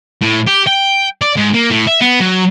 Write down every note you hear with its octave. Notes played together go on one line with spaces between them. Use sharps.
A2
G4
G5
D5
G#2
A#3
A2
E5
B3
F#3